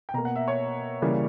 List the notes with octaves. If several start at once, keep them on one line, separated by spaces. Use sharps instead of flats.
G5
B2 A#3 A#5
F#5
E5
C#5
C#3 E3 G3 A#3